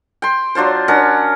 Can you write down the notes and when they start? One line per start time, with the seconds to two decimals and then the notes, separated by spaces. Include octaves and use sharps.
0.22 G5 C6
0.55 F#3 D4 F4 C5
0.88 C#4 D4 A#4 F#5